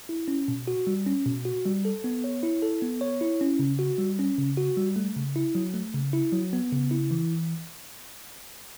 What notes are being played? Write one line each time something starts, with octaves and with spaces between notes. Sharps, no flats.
E4
C#4
B2
F#4
G3
C#4
B2
F#4
G3
A4
B3
C#5
E4
A4
B3
C#5
E4
C#4
C#3
F#4
G3
C#4
C#3
F#4
G3
A3
C#3
E4
F#3
A3
C#3
E4
F#3
B3
C#3
E4
E3